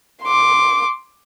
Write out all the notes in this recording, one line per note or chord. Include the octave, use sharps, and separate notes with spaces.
C6 D6